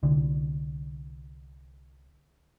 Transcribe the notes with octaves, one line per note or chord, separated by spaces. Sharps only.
C2 D3